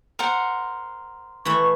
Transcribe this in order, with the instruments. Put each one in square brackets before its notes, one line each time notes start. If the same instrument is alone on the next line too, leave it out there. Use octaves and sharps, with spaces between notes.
[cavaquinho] A#4 C5 F#5
[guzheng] E3 A3 E4 [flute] C#6